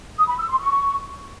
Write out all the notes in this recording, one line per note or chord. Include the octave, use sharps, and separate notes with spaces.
D#6
B5
E6
C6
C#6